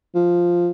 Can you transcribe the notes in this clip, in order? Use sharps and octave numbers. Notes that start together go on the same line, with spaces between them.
F3